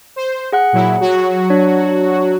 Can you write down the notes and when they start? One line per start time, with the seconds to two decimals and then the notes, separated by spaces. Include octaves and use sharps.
0.16 C5
0.52 G#4 F#5 F#6
0.73 A#2 F#3 E4
1.01 F#3 F#4
1.50 D4 C#5